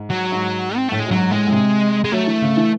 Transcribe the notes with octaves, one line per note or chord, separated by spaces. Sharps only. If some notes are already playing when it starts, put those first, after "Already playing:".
Already playing: G#2
F#3
G#2
C4
A2 A3
G#3
F#2
G#2 F#3
A2 G#3
A2
C3
G#3
F#3 A3
E3
C#3
E3